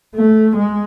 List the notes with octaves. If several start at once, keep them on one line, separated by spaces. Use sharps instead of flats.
A3
G#3